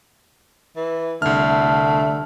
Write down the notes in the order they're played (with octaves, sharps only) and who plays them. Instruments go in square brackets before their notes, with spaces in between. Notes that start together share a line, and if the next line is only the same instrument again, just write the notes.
[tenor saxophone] E3
[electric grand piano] C2 F6 [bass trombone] D3 [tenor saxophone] A3